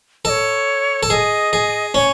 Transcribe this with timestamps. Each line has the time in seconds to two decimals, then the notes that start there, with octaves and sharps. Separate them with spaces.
0.25 A4 D#5
0.29 C#5
1.03 A4
1.10 G#4 D#5
1.53 G#4
1.94 C#4 C#5